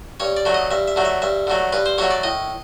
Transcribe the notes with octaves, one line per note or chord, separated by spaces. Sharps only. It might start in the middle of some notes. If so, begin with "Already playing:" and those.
G2 C#5
D5
D3 F#3 A3
D#5
G2 E5
E5
D3 F#3 A3
E5
G2 E5
D3 F#3 A3
G2 B4
C5
D3 F#3 A3 C#5
D5
A2 D#5